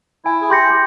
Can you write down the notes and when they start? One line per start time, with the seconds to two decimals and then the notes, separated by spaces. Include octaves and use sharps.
0.25 E4 G#5
0.41 G#4
0.50 G4 C6 G6 A#6 C#7